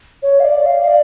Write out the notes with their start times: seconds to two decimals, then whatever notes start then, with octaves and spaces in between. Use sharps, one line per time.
0.23 C#5
0.40 F5
0.45 D5
0.66 F5
0.81 F5
0.88 D5